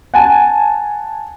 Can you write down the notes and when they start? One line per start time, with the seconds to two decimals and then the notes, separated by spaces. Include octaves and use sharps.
0.14 F#5 G#5 A5